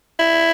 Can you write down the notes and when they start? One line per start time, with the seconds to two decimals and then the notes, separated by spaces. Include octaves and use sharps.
0.19 E4